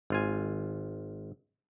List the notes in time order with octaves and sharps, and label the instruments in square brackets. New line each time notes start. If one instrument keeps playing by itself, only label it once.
[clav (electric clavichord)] G#1 F4 G#5